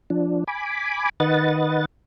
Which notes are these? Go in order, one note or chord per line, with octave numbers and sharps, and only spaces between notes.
F3 D4
G#5 B5 D6
D#3 B4 D#5 F#5 A6